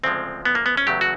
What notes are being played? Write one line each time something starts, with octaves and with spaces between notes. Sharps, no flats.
D2 C#3 F3 G#3 C4
B3
A#3
B3
C#4
E2 C#3 F#3 A3 G4
F#4